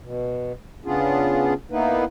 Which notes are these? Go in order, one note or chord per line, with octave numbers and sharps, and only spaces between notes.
B2
C#3 B3 C#4 D4 F4 G#4
A#3 B3 D#4 E4 B4